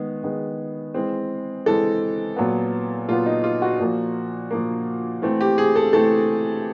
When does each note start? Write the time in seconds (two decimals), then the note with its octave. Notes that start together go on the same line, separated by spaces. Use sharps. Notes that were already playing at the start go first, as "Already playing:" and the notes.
Already playing: D#3 G#3 B3
0.23 D#3 G#3 B3
0.94 E3 G#3 C4
1.66 E3 G#3 C4 A4
2.36 A#2 F#3 B3
3.08 A#2 F#3 B3 F4
3.26 D#4
3.44 F4
3.62 F#4
3.80 A#2 F3 A#3
4.51 A#2 F3 A#3
5.22 E3 A3 C4
5.41 G4
5.58 G#4
5.76 A4
5.93 E3 A3 C4 A4